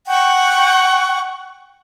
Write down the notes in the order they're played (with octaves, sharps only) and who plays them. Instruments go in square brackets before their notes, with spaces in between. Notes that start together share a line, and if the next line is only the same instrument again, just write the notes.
[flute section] F#5 G5 C#6